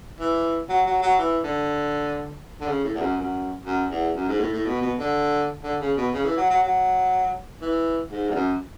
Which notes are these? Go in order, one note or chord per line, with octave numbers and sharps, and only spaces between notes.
E3
F#3
F#3
F#3
E3
D3
D3
C#3
A2
E2
F#2
F#2
F#2
E2
F#2
G#2
A2
A2
B2
B2
D3
D3
C#3
B2
C#3
E3
F#3
F#3
F#3
E3
G#2
E2
F#2